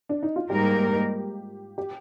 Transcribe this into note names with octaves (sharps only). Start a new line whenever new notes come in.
D4
D#4
F4
G#2 G3 A#3 D#4 G4 A#4
G4